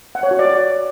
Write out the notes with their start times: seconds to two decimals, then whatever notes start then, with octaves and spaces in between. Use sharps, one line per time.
0.15 F#5
0.23 C#5
0.31 F#4
0.39 D5